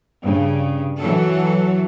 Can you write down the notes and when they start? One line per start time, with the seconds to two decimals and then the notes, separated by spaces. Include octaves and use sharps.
0.21 G2 C#3
0.98 E3 F#3 A4